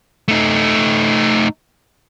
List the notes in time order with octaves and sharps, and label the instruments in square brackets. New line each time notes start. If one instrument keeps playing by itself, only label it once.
[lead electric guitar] A3 D#4